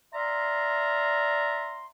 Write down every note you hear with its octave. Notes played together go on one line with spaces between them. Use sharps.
D5 E5 F5 A#5 C6